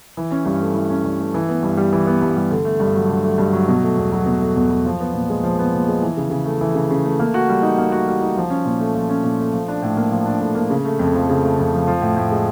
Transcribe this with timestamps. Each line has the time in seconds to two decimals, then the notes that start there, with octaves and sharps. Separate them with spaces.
0.17 E3
0.31 C#4
0.45 G2
0.60 A3
0.75 E3
0.90 C#4
1.04 G2
1.19 A3
1.34 E3
1.49 B3
1.63 G2
1.77 G3
1.93 E3
2.07 B3
2.22 G2
2.36 G3
2.51 D3
2.65 A3
2.80 G2
2.95 F#3
3.10 D3
3.24 A3
3.38 G2
3.53 F#3
3.68 B2
3.82 A3
3.97 E2
4.12 F#3
4.26 B2
4.41 A3
4.55 E2
4.70 F#3
4.85 F3
5.00 B3
5.13 A#2
5.29 G#3
5.43 F3
5.59 B3
5.73 A#2
5.88 G#3
6.02 E3
6.17 C#3
6.31 C#3
6.46 A3
6.61 E3
6.74 C#3
6.90 C#3
7.04 A3
7.19 A#3
7.34 F#4
7.49 G3
7.62 D#4
7.78 A#3
7.92 F#4
8.07 G3
8.21 D#4
8.37 F3
8.50 C#4
8.65 A#2
8.80 A3
8.95 F3
9.09 C#4
9.23 A#2
9.39 A3
9.53 F3
9.68 D4
9.82 A2
9.96 A#3
10.12 F3
10.26 D4
10.40 A2
10.55 A#3
10.70 C#3
10.85 A3
10.99 F2
11.15 F3
11.29 C#3
11.43 A3
11.58 F2
11.73 F3
11.87 F3
12.01 A2
12.16 A2
12.31 G#3